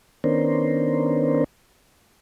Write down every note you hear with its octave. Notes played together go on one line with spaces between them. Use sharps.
D#3 B3 C#4 D4 A#4 C5